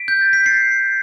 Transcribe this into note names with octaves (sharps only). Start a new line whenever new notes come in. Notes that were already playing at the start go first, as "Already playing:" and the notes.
Already playing: B6 D7
G6
A6
B6
A6 C7